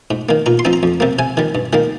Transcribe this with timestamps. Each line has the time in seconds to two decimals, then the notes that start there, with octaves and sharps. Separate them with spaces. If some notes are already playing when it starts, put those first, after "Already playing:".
0.11 G#2
0.29 D#3 A#3
0.46 A#2 A#5
0.59 C6
0.65 F3 C4 D#4
0.73 A#5
0.83 F2
1.00 C3 G3 A#3
1.19 C3 G#5
1.37 D#3 G3
1.55 G2
1.73 D#3 G3 A#3